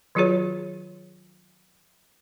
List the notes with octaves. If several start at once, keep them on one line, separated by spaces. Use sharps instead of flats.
D#3 F#3 F4 F#4 G#4 C#5